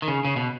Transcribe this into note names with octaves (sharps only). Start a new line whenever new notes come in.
D#3
C#3
C#3
B2